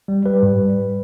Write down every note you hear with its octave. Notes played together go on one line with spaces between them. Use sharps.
G3
G3 B4
G#2